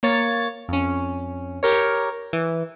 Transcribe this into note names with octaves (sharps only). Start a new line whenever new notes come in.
A#3 C#5 A6
F2 C#4
G4 A#4 C#5
E3